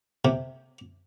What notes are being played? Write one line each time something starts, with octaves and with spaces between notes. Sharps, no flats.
C3